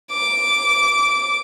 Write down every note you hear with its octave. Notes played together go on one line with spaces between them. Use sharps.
D6